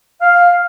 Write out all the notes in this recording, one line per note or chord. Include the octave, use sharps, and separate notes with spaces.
F5